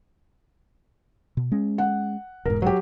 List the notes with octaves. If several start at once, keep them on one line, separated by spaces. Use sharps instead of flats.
B2
G#3 C#4
F#5
E1 G#2 A#4
F#3 G4